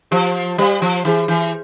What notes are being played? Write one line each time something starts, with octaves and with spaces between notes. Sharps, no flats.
F3 G4 C5 F5
G3 G4 C5 F5
F3
E3 E4 G#4 C5
E3